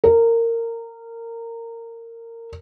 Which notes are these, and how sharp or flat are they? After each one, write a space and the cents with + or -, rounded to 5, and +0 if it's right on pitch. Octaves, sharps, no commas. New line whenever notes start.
A#4 -20